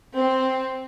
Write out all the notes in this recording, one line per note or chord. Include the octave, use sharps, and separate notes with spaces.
C4